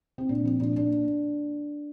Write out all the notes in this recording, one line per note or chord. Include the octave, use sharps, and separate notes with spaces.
C4
A#2 D4
F3 C4
A#2 D4
A#3 D4